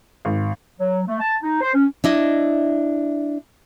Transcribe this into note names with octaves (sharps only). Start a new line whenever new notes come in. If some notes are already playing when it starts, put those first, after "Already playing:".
G#1
F#3
A3
A5
D#4
C5
C#4
D4 E4 D#5